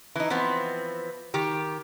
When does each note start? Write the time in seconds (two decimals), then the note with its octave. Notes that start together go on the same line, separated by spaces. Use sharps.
0.16 E3 D#4
0.30 E3 F3 B3 C4
1.34 D#3 G4